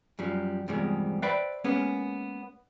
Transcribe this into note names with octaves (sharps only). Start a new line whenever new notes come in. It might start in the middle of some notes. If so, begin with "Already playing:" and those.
F#2 F3 G3
E2 G2 C3 F3 G3 G#3
B4 C5 D5 E5 G5 B5
G#3 A#3 B3 C#4